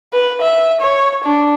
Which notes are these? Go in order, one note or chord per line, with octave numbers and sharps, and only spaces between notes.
B4
E5
C#5
D4